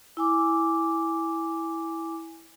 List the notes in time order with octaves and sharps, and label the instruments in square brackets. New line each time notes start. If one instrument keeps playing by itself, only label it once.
[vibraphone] E4 G#5 D6